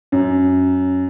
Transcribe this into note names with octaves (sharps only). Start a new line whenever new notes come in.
F#2